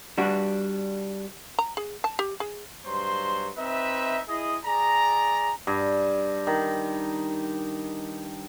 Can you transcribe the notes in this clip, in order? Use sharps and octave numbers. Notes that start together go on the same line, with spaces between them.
G3 D4 F#4
A#5
G#4
A5
G4
G#4
G2 F#3 C5 C6
C4 D#4 B4 E5
E4 G#4 D#5
G#4 D5 A#5
G2
D#3